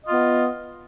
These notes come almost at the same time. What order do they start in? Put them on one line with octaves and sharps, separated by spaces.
D#5 F4 B3